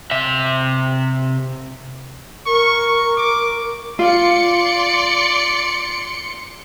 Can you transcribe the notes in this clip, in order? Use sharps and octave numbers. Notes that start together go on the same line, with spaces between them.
C3 E5
A#4 C#6
D6
F4 D5 C6 C#7